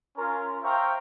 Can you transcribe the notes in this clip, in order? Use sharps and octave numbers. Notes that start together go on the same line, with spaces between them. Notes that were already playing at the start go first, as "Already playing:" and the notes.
C#4 F4 A#4
C5 E5 F5 G5 A#5 C#6